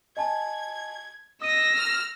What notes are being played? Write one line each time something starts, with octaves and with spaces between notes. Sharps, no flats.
D#5 G#5 A5 G#6
D#5 D#6 E6 A#6 D#7
F6